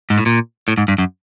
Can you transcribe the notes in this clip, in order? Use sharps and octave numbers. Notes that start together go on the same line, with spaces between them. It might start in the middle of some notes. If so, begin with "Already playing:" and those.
G#2
A2
A#2
A2
G#2
G2
F#2